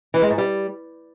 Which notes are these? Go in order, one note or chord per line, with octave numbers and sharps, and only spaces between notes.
E3
G#3
G#2
G3